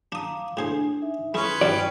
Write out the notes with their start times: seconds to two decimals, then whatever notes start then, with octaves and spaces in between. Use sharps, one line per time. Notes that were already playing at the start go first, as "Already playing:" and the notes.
0.12 D4 F5 A#5 D6 D#6
0.57 A2 D4 G#4 C5 G#5
1.02 D#4 E5
1.34 G#3 C#4 E4 B4 C6 C#6 D#6
1.61 G2 E3 F#3 D5 G5